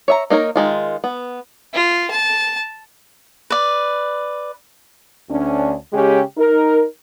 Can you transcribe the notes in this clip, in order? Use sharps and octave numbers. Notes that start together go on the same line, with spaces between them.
C#5 E5 A#5
A#3 D#4 A#4 C#5
D#3 G#3 F4
B3
F4
A5
B4 D5
D2 C#4 D4
C#3 G#3 C#4 G4
D#4 A#4